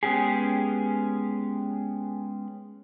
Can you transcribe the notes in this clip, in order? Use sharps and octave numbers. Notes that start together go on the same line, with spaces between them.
G#3 B3 C#4 G4 G#4